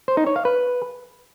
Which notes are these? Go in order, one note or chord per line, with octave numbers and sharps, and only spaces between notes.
C5
D#4
C#5
F5
B4